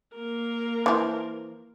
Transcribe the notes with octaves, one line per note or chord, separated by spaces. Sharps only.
A#3 A#4
E3 F3